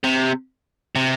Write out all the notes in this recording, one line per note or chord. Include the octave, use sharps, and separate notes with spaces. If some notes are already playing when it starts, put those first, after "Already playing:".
C3
C3